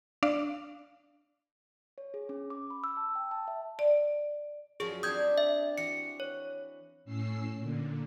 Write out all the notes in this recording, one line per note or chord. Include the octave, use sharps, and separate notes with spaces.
D4 D5 F5
C#5
G#4
C#4
D6
B5
E6
A5
G5
A5
E5
D5
F#2 F3 F#3 G#4
C4 D4 G4 D#6 G6 G#6
E5
E3 F#4 C#7
C#5
A2 C#4 E6 C7
A#2 D3